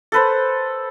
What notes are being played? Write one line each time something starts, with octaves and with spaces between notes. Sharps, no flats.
A4 B4 C5